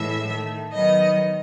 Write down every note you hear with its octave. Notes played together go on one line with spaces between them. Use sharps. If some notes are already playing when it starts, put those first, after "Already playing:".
Already playing: A2 E3 G#3 E5
D#3 A3
D#3 F#3 B3 D#5